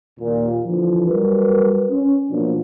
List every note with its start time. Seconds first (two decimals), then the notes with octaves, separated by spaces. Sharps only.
0.19 D#2 A#2
0.65 D3 E3 F3
1.07 F#3 G3 A#4 B4
1.90 C#4
2.30 B2 F3 F#3 A#3 D4